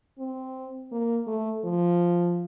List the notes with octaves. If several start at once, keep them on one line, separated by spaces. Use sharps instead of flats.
C4
A#3
A3
F3